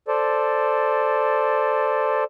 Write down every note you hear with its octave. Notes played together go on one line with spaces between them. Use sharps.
A4 C5 D5